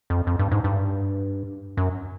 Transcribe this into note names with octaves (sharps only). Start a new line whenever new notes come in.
F2
F2
G2
G#2
G2
F#2